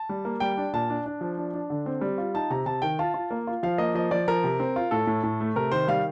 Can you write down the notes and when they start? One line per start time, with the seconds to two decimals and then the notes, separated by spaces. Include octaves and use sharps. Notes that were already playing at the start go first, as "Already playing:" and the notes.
Already playing: A5
0.09 G3
0.25 A#3
0.40 G3 G5
0.57 D4
0.73 A#2 A5
0.90 D4
1.06 D4
1.21 F3
1.38 D4
1.54 D4
1.70 D3
1.86 C4
2.01 G3
2.18 F4
2.34 D#4 A5
2.50 C3 A#5
2.66 C3 A5
2.82 D#3 G5
2.99 F4 A5
3.14 F4
3.31 A#3
3.47 F4
3.63 F3 F5
3.78 A#3 D#5
3.94 F3 D#5
4.11 F3 D5
4.28 F3 A#4
4.44 C3
4.60 C4
4.76 F4
4.91 A2 A4
5.07 A2
5.23 A2
5.40 A3
5.56 C3 A#4
5.71 D#3 C5
5.88 G3 F5